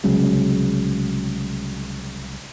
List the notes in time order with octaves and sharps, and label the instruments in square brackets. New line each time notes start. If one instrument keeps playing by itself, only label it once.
[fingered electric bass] C2 C#3 F#3 G#3